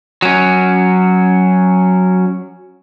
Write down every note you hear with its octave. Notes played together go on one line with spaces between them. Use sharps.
F#3 C#4